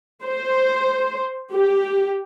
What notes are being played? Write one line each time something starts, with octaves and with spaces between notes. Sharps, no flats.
C5
G4